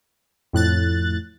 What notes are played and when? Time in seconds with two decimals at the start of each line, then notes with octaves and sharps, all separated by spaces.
0.53 F2 A2 F#6 A6